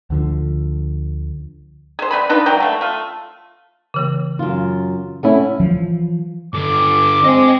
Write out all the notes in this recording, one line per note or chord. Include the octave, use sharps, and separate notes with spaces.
D2 D3 F3
G#4 C5
G3 C4 B4 B5
D4 D#4 F4 B4
E3 F#3 G#3 G5
A3 F5
A3 F4
C#3 E3 A#3
F#2 F4
A3 C#4 E4 F#5
E3 F3
G2 D3 D6
C4 D#5 G#5